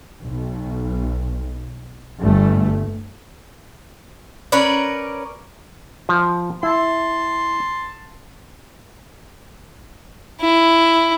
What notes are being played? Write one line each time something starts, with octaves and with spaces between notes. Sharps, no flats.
B1
G1 G2 A3
C#4 A#4 B4 D5
F3
E4 A5 C6
E4